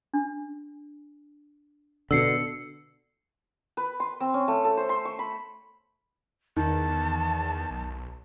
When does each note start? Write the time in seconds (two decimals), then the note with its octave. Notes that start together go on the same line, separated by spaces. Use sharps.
0.14 D4
2.11 B2 D3 E6 C7 C#7
3.77 B4
4.00 C6
4.20 C4
4.34 C#4
4.48 A3
4.64 A4
4.77 C5
4.89 C6
5.05 C#6
5.19 B5
6.57 E2 D#3 A5
7.71 B1